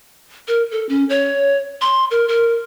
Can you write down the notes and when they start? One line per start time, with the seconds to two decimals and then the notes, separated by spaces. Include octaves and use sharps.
0.48 A#4
0.71 A4
0.89 C#4
1.09 C#5
1.82 C6
2.11 A#4
2.28 A#4